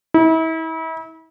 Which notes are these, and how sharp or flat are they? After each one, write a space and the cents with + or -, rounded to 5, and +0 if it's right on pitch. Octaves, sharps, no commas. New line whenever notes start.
E4 -35